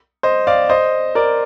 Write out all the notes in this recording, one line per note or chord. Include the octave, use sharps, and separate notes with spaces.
C5 D#5
D5 F5
C5 D#5
A#4 D5